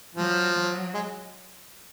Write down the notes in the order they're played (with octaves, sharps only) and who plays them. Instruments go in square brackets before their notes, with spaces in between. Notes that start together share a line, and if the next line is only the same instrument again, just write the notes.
[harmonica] F3 [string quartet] F#3
[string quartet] F#3
[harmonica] G#3